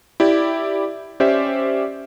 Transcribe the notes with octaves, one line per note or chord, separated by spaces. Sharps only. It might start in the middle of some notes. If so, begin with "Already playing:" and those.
E4 G4 D5
C#4 G4 C5 D5 E5